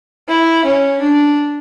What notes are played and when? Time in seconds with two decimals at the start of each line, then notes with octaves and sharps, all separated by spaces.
0.29 E4
0.65 C#4
1.00 D4